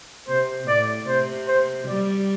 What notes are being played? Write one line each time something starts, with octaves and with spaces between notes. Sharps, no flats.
C3 C5
A2 D5
C3 C5
C5
G3 D5